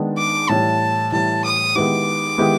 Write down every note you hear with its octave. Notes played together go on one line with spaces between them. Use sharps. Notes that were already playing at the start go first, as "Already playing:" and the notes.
Already playing: D#3 G#3 B3 D4
D6
A2 E3 G3 A5
A2 E3 G3 A5
D#6
D#3 G#3 B3 E4 G4 D6
D#3 G#3 B3 E4 G4